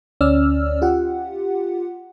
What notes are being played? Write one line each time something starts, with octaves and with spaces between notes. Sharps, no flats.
D2 C#4 D5 E6 F6
F4 G4 F#5